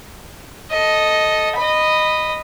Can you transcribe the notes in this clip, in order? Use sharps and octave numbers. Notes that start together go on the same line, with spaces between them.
A4 D#5
D#5 B5